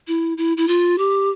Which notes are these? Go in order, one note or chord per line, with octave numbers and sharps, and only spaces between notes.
E4
E4
E4
F4
G4